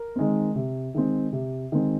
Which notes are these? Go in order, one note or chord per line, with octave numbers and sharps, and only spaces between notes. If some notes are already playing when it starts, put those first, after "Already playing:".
Already playing: A#4
D#3 G#3 C4
C3
D#3 G#3 C4
C3
D#3 G#3 C4